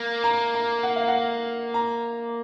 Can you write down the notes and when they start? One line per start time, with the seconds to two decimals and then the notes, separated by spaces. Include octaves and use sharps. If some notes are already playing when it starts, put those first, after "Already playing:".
Already playing: A#3
0.24 A#5
0.54 A#5
0.83 F#5
0.96 F5
1.08 F#5
1.74 A#5